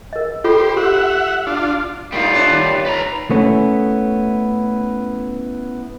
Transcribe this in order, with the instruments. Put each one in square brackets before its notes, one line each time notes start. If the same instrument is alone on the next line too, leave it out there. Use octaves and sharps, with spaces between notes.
[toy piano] A#4 D#5
[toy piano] F4 A4 B5 [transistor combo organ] G4 C5
[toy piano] G4 [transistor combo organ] E5 F#5
[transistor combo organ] D4 F4
[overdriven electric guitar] G3 F4 [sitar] A#3 D#4
[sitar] D4 E4 C#5
D#2
[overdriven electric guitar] B4 A#5
[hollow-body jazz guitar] A3 B3 C#4 E4